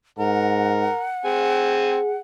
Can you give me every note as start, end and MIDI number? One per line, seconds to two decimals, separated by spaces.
0.19 0.89 44
0.19 1.06 70
0.19 2.18 78
1.25 1.98 60
1.25 2.19 68
1.25 1.98 80